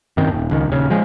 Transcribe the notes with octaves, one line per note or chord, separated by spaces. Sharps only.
F#2 D#3 C4
D#1
C#2 D#3
D#1 C#3
F3 G#3